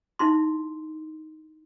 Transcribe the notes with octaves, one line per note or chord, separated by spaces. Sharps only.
D#4 E4 C6